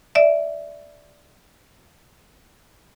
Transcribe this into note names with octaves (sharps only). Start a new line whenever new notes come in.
D5 E5